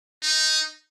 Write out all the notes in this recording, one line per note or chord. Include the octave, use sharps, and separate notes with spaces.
D#4